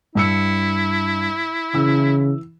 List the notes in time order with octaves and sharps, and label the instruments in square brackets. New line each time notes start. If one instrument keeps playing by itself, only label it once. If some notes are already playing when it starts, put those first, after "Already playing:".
[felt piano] G2 E6 C#7 [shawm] E4
[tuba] C#3 [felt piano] E3 E6